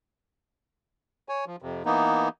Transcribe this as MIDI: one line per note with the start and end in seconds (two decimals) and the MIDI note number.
1.29 1.45 73
1.29 1.45 80
1.47 1.56 53
1.62 1.83 41
1.62 1.83 48
1.86 2.29 52
1.86 2.29 58
1.86 2.29 59
1.86 2.29 63